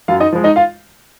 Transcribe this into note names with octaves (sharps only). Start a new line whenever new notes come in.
F#2 F4 F5
D#4 D#5
F3 G#3
D#4 D#5
F4 F5